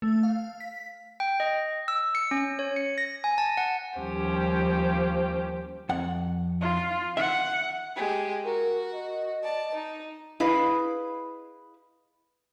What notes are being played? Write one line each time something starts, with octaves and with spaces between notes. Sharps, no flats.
A3
F5
B6
G5
D#5
E6
C#7
C#4
C#5
C#7
A#6
G#5
A5
F#5
D#2 F3 G3 C#4 G4 C5
F2 F#5
F4
E5 F#5
G#3 G4
F#4 A#4
D#5
D5 A5
D#4
E4 G#4 B4 D#5 F5